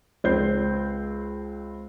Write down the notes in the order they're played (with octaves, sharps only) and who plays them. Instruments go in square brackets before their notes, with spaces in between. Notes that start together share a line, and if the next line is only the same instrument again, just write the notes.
[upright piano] C#2 C4 C5 G6 C7